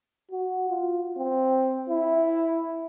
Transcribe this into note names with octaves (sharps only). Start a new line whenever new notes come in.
F#4
F4
C4
E4